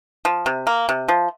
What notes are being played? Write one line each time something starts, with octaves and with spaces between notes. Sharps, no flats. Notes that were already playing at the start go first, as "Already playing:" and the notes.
F3
C3
A#3
C3
F3